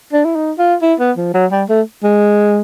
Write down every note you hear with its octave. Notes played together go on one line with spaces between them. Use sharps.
D4
E4
D#4
F4
E4
B3
F3
F#3
G3
A3
G#3